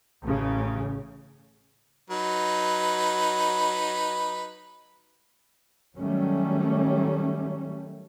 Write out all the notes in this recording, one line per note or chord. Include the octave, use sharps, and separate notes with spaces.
A1 C#3
F#3 D#4 B4
D#3 F#3 G3 A3 C#4